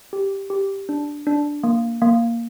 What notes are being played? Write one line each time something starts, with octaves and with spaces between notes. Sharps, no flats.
G4
G4
D4
D4
A#3
A#3